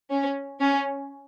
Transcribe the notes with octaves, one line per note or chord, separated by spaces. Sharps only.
C#4
C#4